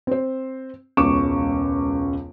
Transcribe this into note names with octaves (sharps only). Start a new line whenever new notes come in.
C4 C5
E1 C#2 C#3 C#6 D6 E7